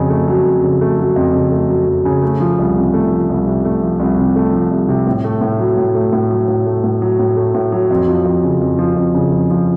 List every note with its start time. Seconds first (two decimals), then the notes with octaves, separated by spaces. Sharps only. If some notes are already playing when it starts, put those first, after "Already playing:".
Already playing: F2 C#3 F#3
0.10 A3
0.28 F#3
0.45 F2
0.63 C#3
0.81 A3
0.99 F#3
1.16 F2
1.34 C#3
1.52 A3
1.70 F#3
1.87 F2
2.05 C#3
2.22 A3
2.40 F3
2.59 C2
2.76 C3
2.94 A3
3.11 F3
3.29 C2
3.47 C3
3.65 A3
3.83 F3
3.99 C2
4.18 C3
4.36 A3
4.53 F3
4.70 C2
4.89 C3
5.07 A2
5.24 A3
5.41 A2
5.59 F#3
5.77 A2
5.95 A3
6.13 A2
6.31 F#3
6.48 A2
6.66 A3
6.84 A2
7.02 F#3
7.19 A2
7.37 A3
7.54 A2
7.72 F#3
7.91 F2
8.08 F3
8.25 F2
8.43 C#3
8.61 F2
8.79 F3
8.96 F2
9.15 C#3
9.32 F2
9.50 F3